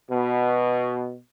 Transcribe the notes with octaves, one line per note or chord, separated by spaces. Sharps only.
B2